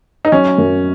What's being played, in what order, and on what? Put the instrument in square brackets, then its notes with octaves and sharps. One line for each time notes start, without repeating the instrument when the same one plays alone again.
[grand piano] D#4
[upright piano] F#3 [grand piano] C#4
[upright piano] F#2